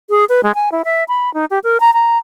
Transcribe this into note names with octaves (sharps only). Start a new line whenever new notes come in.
G#4
B4
G#3
G#5
E4
E5
B5
D#4
G4
A#4
A#5
A#5